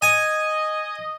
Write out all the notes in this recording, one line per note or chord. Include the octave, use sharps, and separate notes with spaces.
D#5 G#5